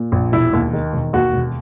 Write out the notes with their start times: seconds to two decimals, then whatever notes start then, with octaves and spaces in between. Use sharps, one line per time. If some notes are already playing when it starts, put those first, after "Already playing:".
Already playing: A#2
0.12 A#1
0.32 E1 E4
0.53 D#2
0.73 D#3
0.93 E1
1.13 D#2 F#4
1.34 E1